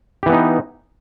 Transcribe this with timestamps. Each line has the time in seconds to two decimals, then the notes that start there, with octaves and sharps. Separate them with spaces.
0.23 G4
0.26 E3
0.29 B3
0.33 D#4